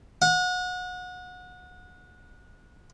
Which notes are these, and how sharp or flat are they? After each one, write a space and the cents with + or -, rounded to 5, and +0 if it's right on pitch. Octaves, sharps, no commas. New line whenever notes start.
F#5 -30